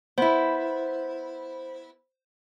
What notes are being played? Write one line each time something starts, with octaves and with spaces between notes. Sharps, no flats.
B3 E4 C5